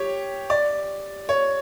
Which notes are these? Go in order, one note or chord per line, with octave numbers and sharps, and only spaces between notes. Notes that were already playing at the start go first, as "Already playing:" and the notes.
Already playing: G4 C#5
D5
C#5